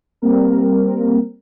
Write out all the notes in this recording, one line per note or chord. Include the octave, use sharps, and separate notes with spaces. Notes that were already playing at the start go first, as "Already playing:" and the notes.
G3 A#3 C4 A#4